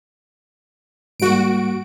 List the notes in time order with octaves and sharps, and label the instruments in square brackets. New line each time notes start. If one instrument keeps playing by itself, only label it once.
[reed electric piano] G#2 G3 A#3 [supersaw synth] F#4 D7